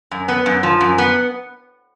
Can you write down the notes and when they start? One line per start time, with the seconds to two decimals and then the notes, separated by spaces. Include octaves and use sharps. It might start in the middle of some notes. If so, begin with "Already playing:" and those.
0.11 F#2
0.28 B3
0.46 F#2
0.63 F3
0.81 F#2
0.98 B3